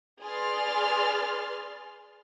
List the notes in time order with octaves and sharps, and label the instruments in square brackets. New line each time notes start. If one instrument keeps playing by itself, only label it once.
[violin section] G#4 B4 D5 C6 F6 A6